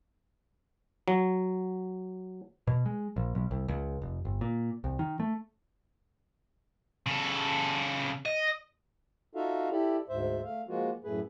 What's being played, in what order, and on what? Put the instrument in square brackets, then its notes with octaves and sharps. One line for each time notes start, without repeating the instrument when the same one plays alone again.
[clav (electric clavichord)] F#3
[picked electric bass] B2
G#3
A#1
B1
C2
C#2
F1
G1
A#2
C2
D#3
A3
[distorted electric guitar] C#3 A4
D#5
[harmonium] D#4 F4 F#4 A4 E5 F5
E4 G4 A4 D5
D2 G#2 C5 E5
A3 F5
F3 G#3 A#3 F4 F#4
F#2 A2 A3 G#4 B4